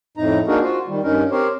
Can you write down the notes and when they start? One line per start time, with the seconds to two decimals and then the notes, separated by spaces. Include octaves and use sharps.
0.17 F2 A2 D#4 A#5
0.47 A#3 D4 D#4 F#4 G#4 A#4
0.63 F4 F#4 C5
0.88 D#3 G3
1.04 G2 C#4 D#4 A#4
1.31 C4 G4 A#4 C5 C#5